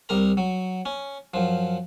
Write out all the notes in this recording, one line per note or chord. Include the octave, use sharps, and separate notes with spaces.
C2 G3 A#4 A#5
F#3
C#4
F#2 F3